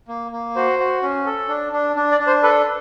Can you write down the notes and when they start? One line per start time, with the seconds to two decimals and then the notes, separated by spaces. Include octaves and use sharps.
0.08 A#3
0.32 A#3
0.56 F#4 C5
0.79 F#4
1.02 C#4
1.26 A4
1.49 D4
1.73 D4
1.96 D4
2.12 D5
2.19 D4
2.27 C5
2.43 A4 B4